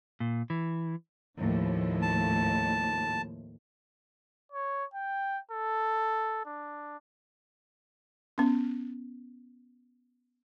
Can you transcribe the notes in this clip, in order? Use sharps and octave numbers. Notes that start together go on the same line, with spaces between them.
A#2
E3
D#2 A2 F3
A5
C#5
G5
A4
D4
B3 C#4